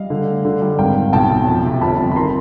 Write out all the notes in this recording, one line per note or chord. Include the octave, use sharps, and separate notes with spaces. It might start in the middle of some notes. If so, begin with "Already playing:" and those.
Already playing: G3 D#5 F5
D3
A3
D3
G3
G#1 F5 G5
G#1
B1 G5 A5
B1
F2
C3
G1 A5 B5
F2
B5
D#3 A#5 C6